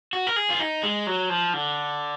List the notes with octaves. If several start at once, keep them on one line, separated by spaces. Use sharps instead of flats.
F#4
A#4
G#4
F4
D#4
G#3
F#3
F3
D3